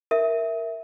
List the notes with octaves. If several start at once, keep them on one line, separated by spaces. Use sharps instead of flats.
A#4 E5